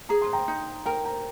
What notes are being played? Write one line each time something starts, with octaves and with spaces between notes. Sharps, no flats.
G#4 A#5
C6
G5 A#5
D#4
A#4 G5 A#5
G5 A#5